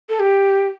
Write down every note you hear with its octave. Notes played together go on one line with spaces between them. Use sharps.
A4
G4